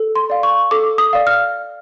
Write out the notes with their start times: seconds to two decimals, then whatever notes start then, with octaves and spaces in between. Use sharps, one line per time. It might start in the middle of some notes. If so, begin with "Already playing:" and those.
Already playing: A4
0.16 C6
0.30 D5 F5
0.43 C#6
0.71 A4 D6
0.98 D#6
1.13 D5 F5
1.27 F6